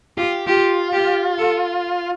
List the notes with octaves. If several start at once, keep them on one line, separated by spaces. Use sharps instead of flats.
F4 G4
F4 G4
G4
A4